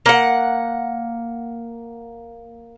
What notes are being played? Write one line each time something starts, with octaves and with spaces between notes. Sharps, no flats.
A#3 F#5